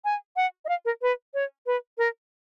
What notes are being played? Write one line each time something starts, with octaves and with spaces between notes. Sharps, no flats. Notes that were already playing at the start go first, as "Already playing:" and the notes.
G#5
F#5
D#5
F5
A#4
B4
C#5
B4
A#4